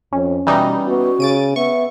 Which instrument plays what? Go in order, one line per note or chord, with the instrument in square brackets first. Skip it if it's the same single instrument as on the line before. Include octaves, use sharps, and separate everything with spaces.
[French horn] F2 [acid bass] C#4
[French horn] B2 [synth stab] E3 G3 D#4
[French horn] B3 [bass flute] F#4
[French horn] C#3 [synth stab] A6 D7 D#7
[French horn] B3 [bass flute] E5 [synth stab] C#6